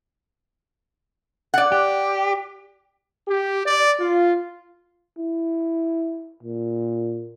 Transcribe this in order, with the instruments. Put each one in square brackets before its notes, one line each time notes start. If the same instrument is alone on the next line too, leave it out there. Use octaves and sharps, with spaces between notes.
[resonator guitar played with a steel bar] D5 F#5
[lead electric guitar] G4
[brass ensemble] G4
D5
F4
[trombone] E4
A#2